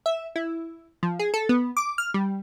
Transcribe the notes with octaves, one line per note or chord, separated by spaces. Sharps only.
E5
E4
F3
G#4
A4
B3
D6
F6
G3